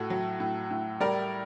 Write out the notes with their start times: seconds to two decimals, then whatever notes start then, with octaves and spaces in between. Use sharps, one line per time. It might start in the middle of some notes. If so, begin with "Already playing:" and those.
Already playing: A2 F#4 A4
0.10 F#3
0.40 A2
0.71 A2
1.00 G3 A#4 D5